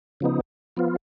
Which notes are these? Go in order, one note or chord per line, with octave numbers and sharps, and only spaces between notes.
C#3 F3 B3 D#4
F3 B3 F4